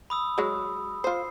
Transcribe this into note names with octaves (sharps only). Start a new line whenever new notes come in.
B5 D#6 E6
F#3 G#3
F4 C5 C7